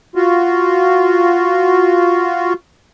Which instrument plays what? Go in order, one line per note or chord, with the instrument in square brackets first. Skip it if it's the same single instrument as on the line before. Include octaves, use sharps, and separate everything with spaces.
[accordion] F4 F#4